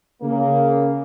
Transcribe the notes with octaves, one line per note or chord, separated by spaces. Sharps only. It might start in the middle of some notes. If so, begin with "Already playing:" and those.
C#3 A#3